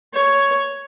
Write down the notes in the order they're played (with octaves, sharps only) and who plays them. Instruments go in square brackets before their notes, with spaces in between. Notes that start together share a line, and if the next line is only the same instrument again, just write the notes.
[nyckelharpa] C#5